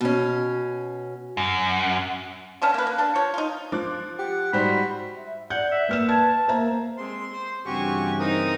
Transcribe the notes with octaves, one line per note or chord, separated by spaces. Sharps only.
B2 C#4
F#2
D3 A3 C#4 A5
A#3 B4
A#3
D4 A5
F3 C#5
D#4 F4
F3 D6 F#6
G4 F#5
G#2 G3 F#4 C5 B5
E5
D5 F#5 G6
E5
A#3 B4 F6 E7
A5 G#6
A#3 C5 E5 A#5
G#3 C4 C6
C5
G2 C#3 E3 C4 F#4 G4 G#5 C#6
C4 D#4 A#4 D#6